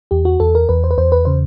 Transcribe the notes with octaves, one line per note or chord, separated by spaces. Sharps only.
E2 G4
F#4
E2 A4
A#4
E2 B4
C5
B4
E2 C5
B4
C#3 C5